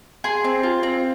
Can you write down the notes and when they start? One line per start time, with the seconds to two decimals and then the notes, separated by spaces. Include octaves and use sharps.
0.24 G#4 C6
0.44 C4
0.63 F4
0.83 C4